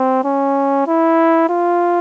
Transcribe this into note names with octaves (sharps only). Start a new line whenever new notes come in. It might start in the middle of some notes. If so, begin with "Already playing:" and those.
Already playing: C4
C#4
E4
F4